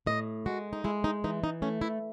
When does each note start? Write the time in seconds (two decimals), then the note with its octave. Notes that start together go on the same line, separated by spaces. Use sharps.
0.06 A2 D#5
0.46 G#3 F#4
0.73 D#4
0.84 G#3 E4
1.04 D#4
1.24 E3 D#4
1.44 D#4
1.62 A3 C#4
1.81 E4